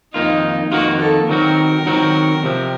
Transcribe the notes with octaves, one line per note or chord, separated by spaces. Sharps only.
F2 D#3 A#3 D#4 F4
F2 D#3 A#3 F4 F#4
A4
D#3 F#3 C4 F#4 A#4
D#3 F#3 C4 F#4
C3 F3 C4